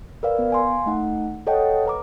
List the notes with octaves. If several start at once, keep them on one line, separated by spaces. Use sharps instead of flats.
A#4 B4 D5 F5
B3
F5 G#5 C6
A3 D#4 F#5
A4 C#5 D#5 F#5 G5 A5
B4 A#5 D6